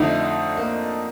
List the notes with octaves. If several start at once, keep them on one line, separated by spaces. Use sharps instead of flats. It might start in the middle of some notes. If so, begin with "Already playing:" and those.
Already playing: F2 D3 A3 D4 D#4
A#3